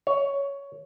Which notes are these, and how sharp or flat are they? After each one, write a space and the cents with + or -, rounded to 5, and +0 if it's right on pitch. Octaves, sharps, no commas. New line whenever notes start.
C#5 +10